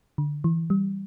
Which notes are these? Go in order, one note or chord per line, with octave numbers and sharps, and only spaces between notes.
D3
E3
G3